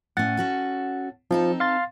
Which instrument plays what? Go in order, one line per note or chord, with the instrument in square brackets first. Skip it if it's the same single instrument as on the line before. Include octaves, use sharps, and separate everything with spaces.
[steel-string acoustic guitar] A2 C#4 [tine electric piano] F#5 A6
[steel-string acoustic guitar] C#4 F#4 A4
[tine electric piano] F3 [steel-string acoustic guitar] C4 D#4 A4
[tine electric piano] F5 C6 A6